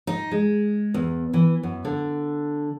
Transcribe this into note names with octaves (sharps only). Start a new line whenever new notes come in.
D#4
G#3
E2
E3
F#2
D3